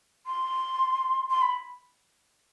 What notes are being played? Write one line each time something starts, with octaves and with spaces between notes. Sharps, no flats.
C6
C6
B5